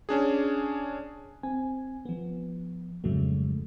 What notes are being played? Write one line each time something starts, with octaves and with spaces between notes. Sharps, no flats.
C#4 D4 G#4
C4 G#5
F3 B3
F2 G#2 C#3 F#3 G#3 A3